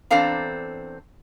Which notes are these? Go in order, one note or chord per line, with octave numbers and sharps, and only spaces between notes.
E2 C4 D4 A4 F5 A#5